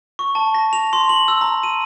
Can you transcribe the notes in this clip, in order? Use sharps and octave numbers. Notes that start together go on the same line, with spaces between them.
C#6
A5
A#6
F7
C6
F#7
E6
A#5
D#7